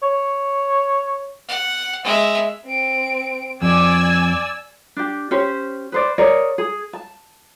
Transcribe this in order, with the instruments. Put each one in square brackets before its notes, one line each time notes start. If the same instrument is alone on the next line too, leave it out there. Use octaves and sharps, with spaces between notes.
[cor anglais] C#5
[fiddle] F#5
G#3 E5
[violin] C4 D7
[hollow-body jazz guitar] F2 [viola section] D5 G#5 [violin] E6
[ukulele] D4 G4
C#4 G4 C5
B4 C5 D5
G#4 A#4 C#5 D5
G#4
A5